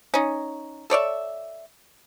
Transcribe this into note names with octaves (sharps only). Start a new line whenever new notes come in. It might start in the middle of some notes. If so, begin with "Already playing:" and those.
C#4 D#4
A4 C#5 D5 E5